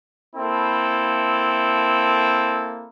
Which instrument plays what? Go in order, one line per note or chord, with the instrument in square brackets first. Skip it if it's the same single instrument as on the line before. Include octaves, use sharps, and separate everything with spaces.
[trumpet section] A#3 C4 E4 A4